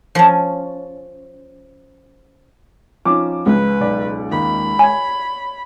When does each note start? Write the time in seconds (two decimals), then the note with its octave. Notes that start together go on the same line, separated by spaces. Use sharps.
0.15 F3 C#4
3.05 F3 C#4 D#4 D6
3.46 C#2 B4
3.81 B1 D5
4.32 D#2 B5
4.79 C#5 G#5 G#6